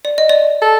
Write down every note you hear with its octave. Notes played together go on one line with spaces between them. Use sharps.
D5
D#5
D5
A4